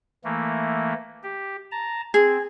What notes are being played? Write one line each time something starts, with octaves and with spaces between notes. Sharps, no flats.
E3 A3 A#3
G4
A5 A#5
C4 G#4